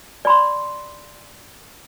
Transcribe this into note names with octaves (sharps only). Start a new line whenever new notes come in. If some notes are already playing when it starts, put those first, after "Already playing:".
D5 B5 C6